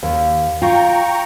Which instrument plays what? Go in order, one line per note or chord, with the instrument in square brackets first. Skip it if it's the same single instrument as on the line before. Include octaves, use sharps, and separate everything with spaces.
[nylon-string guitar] D#2
[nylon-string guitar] F4 [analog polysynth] G5 A#5 C#6